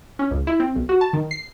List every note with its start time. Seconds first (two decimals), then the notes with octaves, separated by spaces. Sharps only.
0.19 C#4
0.31 C#2
0.47 E4
0.60 C4
0.75 B1
0.89 F#4
1.01 A5
1.13 D#3
1.31 C7